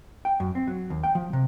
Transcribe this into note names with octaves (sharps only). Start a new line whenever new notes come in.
G5
F#2
C4
F#3
D#2
G5
F3
C3